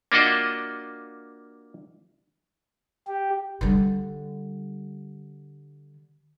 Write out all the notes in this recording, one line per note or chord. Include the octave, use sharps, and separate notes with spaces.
A#3 D4 F4 F#4 D#5 E5
G4
D3 G3